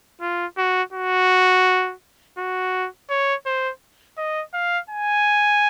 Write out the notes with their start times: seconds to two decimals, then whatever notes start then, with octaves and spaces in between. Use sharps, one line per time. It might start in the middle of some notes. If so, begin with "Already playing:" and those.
0.21 F4
0.57 F#4
0.93 F#4
2.38 F#4
3.10 C#5
3.46 C5
4.18 D#5
4.54 F5
4.90 G#5